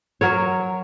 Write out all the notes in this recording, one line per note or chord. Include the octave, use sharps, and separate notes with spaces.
F#3 A#4 C#5